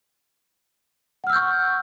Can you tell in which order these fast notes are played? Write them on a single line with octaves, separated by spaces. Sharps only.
F#5 F6 E6 G6 C#6